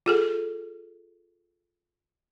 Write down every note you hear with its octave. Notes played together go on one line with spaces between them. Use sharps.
F4 G#4 A4